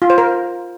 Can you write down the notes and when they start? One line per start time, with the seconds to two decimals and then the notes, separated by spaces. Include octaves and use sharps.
0.02 F4
0.10 C5
0.18 A#4